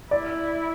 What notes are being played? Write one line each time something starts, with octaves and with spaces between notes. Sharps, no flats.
E4 D5